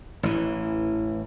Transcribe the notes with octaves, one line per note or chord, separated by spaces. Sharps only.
A1 E3